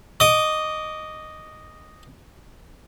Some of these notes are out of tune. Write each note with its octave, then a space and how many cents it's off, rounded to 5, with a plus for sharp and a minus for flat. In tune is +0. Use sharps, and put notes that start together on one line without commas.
D#5 -5 D6 -30